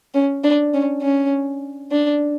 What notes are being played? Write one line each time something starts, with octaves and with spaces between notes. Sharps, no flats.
C#4
D4
C#4
C#4
D4